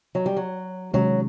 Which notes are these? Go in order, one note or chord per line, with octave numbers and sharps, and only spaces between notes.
F#3
G3
F#3
C3 D#3 F#3 G#3 C#4